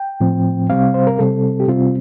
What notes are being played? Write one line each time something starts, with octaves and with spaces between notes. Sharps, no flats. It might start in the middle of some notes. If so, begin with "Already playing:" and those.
Already playing: G5
A2 F3 C4
C3 G3 C4 F5
C5
A#4
C3 G3 C4 A4
G4
C3 G3 C4 F4